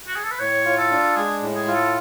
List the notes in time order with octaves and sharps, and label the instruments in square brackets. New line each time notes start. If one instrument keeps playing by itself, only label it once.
[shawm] F#4
G#4
A4
B4
[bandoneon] A2 [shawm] C#5
[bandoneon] F4
[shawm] A4
[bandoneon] D4
[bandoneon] G#3 [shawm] G#4
[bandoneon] A2
[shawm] G#4
[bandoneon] F4
[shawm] A4